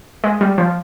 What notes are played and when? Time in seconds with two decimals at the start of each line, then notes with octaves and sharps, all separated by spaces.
0.24 G#3
0.41 G3
0.58 F3